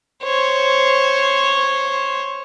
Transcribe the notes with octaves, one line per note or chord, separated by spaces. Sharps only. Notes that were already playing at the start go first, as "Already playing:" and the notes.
C5 C#5